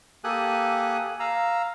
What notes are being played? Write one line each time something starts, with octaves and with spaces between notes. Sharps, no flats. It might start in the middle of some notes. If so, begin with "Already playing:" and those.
A#3 G4 A4 G#5 D#6 F#6
F5 A#5 E6